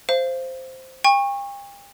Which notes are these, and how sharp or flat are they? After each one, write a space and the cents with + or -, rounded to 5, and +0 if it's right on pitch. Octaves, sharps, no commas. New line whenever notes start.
C5 +0 F5 -30
G5 +40 C#6 -15